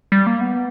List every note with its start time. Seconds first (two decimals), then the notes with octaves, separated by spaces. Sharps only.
0.12 G3
0.27 A#3
0.41 B3